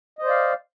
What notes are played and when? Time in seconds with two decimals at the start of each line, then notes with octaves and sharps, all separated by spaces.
0.19 D#5
0.23 C5
0.26 D5
0.30 F5